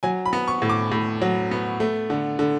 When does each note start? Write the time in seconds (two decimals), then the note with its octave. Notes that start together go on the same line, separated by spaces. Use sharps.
0.03 F#3 G#5
0.26 B5
0.33 B3
0.48 C#6
0.62 A2
0.70 D6
0.92 A2
1.22 F#3
1.51 B3
1.80 A3
2.10 D3
2.39 D3